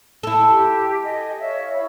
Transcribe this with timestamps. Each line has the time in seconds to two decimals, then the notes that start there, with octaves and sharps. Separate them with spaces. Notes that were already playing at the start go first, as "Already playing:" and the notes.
0.23 E4 A4
0.50 G4
1.04 D#5 G#5
1.39 C#5 E5 F5
1.74 C#5 F5 B5